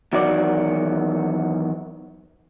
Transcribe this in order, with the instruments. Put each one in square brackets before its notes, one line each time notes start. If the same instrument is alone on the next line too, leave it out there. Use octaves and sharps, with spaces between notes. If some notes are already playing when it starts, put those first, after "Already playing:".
[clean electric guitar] E2 D#3 F#3 F#4 D5